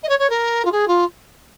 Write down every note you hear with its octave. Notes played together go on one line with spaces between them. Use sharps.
D#5
C#5
C#5
A#4
F4
G#4
F4